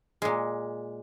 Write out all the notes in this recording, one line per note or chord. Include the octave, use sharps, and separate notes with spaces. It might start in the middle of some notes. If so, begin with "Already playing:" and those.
A#2 G#3